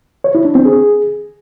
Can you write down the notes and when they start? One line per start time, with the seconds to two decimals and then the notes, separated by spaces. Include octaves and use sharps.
0.24 C#5
0.35 E4
0.45 D4
0.55 C4
0.65 G#4